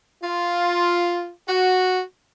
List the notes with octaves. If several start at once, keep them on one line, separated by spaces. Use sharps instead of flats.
F4
F#4